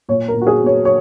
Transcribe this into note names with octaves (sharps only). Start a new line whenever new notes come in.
A#2 C#5
A#4
A#2
F#4
G#4
B3
C#5
C#5